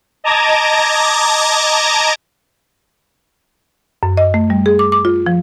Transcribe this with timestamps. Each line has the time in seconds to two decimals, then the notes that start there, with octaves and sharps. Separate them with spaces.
0.24 D#5 A5 A#5 D6 G#6 A#6
4.03 F#2
4.17 D#5
4.34 A3
4.50 G3
4.66 G#4
4.79 D6
4.92 D6
5.05 F4
5.26 F3